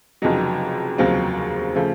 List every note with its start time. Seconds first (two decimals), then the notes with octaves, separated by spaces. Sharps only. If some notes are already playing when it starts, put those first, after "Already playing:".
0.22 F1 F2 C#3 F#3 D#4
0.98 F1 D#2 C#3 F#3 C4 F4
1.75 C#3 F3 A3